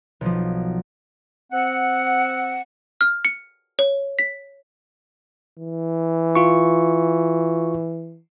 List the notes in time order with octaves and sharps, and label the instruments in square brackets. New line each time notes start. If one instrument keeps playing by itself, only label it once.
[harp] B1 F3
[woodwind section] C4 F#5
[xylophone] F6
C#7
C#5
B6
[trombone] E3
[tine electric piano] F4 C#6